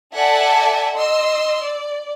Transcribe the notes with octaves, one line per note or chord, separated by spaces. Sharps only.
A4 D5 E5 F#5 G#5 A5
D#5 C6 E6
D5